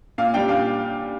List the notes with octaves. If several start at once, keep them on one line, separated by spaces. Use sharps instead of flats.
A#2 F5
G3 D4 G5
A#2 F5